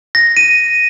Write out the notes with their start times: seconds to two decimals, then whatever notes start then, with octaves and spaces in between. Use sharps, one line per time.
0.15 A#6
0.37 D#7